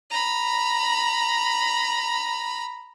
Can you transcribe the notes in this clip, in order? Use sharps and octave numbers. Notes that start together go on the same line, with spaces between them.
A#5 B5